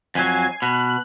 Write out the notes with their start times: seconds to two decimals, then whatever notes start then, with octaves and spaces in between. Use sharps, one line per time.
0.15 F2 F#3 G#5 G#6 C7
0.62 B2 F#6